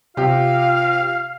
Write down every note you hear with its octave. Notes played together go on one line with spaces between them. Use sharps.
C3 F4 G4 F5